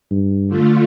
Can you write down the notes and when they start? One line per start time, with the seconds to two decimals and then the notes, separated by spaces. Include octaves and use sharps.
0.11 G2
0.47 D3 A3 F4